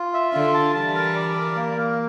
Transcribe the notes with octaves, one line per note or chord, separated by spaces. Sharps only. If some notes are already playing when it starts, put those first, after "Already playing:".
Already playing: F4
E5
D3 F4
A5
E3 G3 A5
A#4
D5
A#4
A#3
A#3